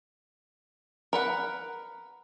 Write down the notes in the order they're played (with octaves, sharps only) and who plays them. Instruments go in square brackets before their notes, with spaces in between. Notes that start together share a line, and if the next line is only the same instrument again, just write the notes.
[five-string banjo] A#4 B4 F#5